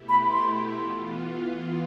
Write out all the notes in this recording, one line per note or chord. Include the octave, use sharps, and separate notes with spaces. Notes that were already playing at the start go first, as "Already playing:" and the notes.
Already playing: B2 A3 E4 G4
B5
C6
E3 B3 F4